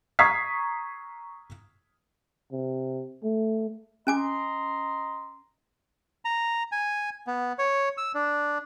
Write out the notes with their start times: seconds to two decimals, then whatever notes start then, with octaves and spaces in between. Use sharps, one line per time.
0.19 A#5 C#6 D#6 G#6 B6 C7
2.52 C3
3.23 A3
4.07 C#4 D#5 G#5 A#5 C6 D6
6.25 A#5
6.72 G#5
7.27 B3
7.59 C#5
7.98 E6
8.14 D4